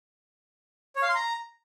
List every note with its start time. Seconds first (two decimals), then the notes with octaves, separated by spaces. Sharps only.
0.96 C#5
1.02 F5
1.09 C6
1.15 A#5